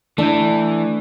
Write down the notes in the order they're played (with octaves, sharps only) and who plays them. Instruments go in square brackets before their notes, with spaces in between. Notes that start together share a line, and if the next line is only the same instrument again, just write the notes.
[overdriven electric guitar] E3 [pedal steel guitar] A3 G6 [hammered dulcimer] D4